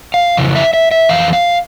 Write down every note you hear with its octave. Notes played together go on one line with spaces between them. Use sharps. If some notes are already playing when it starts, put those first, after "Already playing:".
F5
F2 C#3 E3
E5
E5
E5
F2 E3 F5
F5